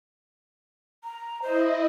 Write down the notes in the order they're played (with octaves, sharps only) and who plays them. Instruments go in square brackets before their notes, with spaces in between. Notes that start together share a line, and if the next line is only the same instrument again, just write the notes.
[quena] A#5
[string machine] E4 D#5 [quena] C5